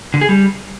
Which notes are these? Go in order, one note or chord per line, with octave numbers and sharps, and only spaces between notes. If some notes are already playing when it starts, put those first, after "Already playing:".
D3
G#4
G3